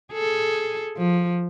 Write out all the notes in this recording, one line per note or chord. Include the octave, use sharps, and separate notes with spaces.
G#4 A4
F3